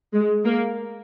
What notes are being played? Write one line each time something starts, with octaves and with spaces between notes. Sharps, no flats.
G#3
A#3